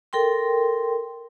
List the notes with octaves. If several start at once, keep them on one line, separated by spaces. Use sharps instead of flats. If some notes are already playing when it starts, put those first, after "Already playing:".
A4 A#4 G5 C6